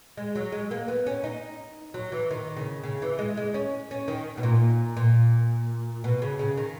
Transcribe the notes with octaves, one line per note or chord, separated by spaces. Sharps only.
G#3
F#3
G#3
A#3
B3
C#4
D#4
F#3
E3
D#3
C#3
C#3
E3
G#3
G#3
C#4
C#4
D#3
B2
A#2
A#2
B2
C#3
C#3
D#3